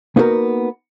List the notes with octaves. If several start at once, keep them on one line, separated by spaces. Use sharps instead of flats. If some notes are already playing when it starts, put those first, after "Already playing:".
A#3 B3 D#4 F#4 G4 A#4